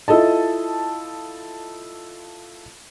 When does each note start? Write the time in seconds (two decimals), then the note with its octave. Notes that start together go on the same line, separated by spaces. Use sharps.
0.08 E4 F4 A4 D#5 A5